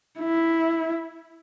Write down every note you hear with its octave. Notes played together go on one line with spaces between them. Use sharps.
E4